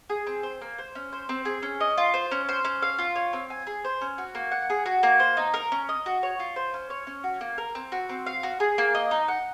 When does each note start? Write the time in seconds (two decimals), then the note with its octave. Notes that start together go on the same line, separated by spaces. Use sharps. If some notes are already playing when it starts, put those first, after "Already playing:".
0.10 G#4
0.27 C4
0.43 C5
0.61 A#3
0.78 C5
0.95 C#4
1.12 C5
1.29 C4
1.45 G#4
1.63 C#4
1.80 D#5
1.98 F4
2.14 C5
2.31 C#4
2.49 C5
2.65 C#4
2.82 F5
2.99 F4
3.16 C#5
3.33 C4
3.50 G#5
3.67 G#4
3.84 C5
4.01 C#4
4.18 F#4
4.35 A#3
4.52 F#5
4.70 G#4
4.86 F#4
5.03 A#3
5.20 C5
5.37 D#4
5.54 A#4
5.72 C#4
5.89 D#5
6.06 F#4
6.23 C#5
6.39 F4
6.56 C5
6.74 C#4
6.90 C#5
7.07 C#4
7.24 F#4
7.41 A#3
7.58 A#4
7.75 C4
7.92 F#4
8.09 C4
8.26 F5
8.43 F#4
8.60 G#4
8.78 A#3
8.95 D#5
9.11 D#4
9.28 F#5